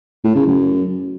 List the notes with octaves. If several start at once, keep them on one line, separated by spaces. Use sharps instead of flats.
A2
C#3
F#2